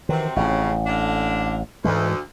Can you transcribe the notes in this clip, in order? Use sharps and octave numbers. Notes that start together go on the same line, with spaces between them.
C3 D#3 E3 F#3 C4
A1 F2 C#3
D3 A#3 D4
D2 G#2 E3 G#3